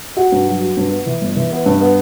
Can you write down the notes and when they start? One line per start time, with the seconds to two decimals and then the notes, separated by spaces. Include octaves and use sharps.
0.17 F#4
0.32 G2
0.48 F#3
0.61 F#4
0.77 G2
0.91 B3
1.06 E3
1.21 G1
1.36 E3
1.51 B3
1.66 G2
1.81 B3